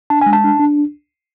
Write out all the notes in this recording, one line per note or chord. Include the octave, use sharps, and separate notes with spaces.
D4 A5
G#5
G#3
A5
D4
D4